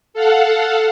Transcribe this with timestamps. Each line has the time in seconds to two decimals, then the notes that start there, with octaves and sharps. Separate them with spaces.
0.14 A4 F5 F#5